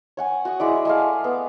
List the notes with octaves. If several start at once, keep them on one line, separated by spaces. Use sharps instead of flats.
C#5 F#5 G#5
F#4 F#5 D#6
G#3 E4 D5
G#3 A3 F5
B3